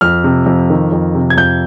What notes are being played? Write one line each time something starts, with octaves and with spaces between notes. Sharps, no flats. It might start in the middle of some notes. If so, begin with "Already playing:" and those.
F2 F6
C3
F2
D#3
F2
C3
G#6
F2 G6